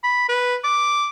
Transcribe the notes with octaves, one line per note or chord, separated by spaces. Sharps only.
B5
B4
D6